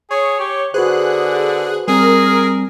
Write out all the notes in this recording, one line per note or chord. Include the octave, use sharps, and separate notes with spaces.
G#4 C#5
G4
D3 F#4 G#4 B4 C5 F#6
G3 C4 G#4 A#4